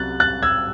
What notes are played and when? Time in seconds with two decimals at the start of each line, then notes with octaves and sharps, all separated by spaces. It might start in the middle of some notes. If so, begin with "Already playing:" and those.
Already playing: C2 C3 F#3 F#6 A6
0.20 F#6 A6
0.43 E6 G#6